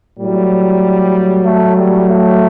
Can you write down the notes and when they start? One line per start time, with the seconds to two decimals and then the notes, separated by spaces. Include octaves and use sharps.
0.19 A2 F#3 G3
1.45 A3
1.77 G3
2.08 A3